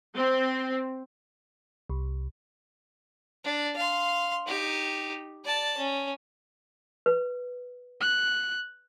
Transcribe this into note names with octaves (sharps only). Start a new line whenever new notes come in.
C4
C2
D4
F5 C6
D#4 G4
D5 A5
C#4
B4
F#6